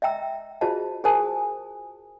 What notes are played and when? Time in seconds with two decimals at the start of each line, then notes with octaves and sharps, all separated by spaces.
0.02 D#5 E5 G5 A#5 E6
0.61 F4 F#4 G#4 C5 D#5 A5
1.04 G#4 A#4 C5 G#5 A5 D#6